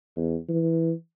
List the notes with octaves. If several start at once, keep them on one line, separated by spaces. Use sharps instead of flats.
E2
E3